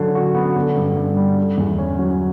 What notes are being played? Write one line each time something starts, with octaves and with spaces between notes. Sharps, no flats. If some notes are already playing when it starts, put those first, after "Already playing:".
Already playing: D3 F#3 C#4
F#4
B3
D3
G2
G2
G3
D3
E2
C#4
F#3